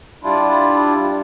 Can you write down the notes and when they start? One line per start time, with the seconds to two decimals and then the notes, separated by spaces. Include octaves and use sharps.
0.24 G3 D4 E4 F4